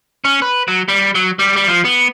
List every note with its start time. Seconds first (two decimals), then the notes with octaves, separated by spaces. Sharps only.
0.25 C#4
0.42 B4
0.68 F#3
0.88 G3
1.15 F#3
1.39 G3
1.56 G3
1.68 F3
1.85 B3